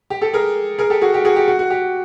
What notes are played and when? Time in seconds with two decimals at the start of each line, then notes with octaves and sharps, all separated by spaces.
0.10 G4
0.21 G4 A4
0.33 G#4 A#4
0.78 G#4 A#4
0.90 G4 A4
1.01 F#4 G#4
1.14 G4
1.25 F#4 G#4
1.36 G4
1.48 F#4
1.59 F#4
1.70 G4